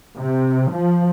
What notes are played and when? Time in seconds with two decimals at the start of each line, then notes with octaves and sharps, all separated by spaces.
0.16 C3
0.71 F3